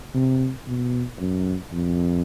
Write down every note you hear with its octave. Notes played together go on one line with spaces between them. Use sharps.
C3
B2
F#2
F2